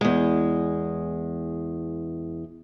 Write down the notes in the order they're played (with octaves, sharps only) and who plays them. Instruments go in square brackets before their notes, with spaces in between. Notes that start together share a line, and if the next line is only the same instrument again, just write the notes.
[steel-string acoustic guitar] E2 G#3